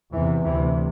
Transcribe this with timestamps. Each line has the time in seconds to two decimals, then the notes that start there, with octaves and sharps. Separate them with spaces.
0.12 E2 C3 E3
0.44 D2 C3 E3